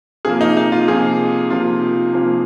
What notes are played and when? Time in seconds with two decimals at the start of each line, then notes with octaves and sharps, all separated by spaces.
0.25 C3 F3 A#3 G#4
0.41 D#4
0.57 D#4
0.72 F4
0.88 C3 F3 A#3 G#4
1.50 C3 F3 A#3 F4
2.13 C3 F3 A#3